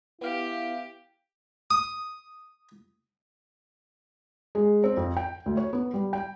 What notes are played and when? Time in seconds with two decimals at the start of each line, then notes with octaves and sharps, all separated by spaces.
0.21 B3 E4 G4 F5
1.71 D#6
4.55 G#3
4.84 C4
4.97 F2
5.17 G5
5.46 D2
5.57 C#5
5.73 B3
5.94 G3
6.13 G5